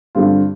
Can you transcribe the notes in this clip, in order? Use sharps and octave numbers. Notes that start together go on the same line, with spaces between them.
G2 D3 G3 C4 F4